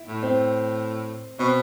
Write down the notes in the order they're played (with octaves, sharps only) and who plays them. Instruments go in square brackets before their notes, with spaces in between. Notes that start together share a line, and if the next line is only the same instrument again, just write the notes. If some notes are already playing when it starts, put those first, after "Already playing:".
Already playing: [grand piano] E4
[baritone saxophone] A2
[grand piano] C4
[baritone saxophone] B2 [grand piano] C4